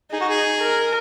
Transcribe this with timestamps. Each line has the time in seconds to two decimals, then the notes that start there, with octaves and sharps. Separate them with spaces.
0.11 D#4 G#4
0.21 F#4
0.29 G#4
0.60 A#4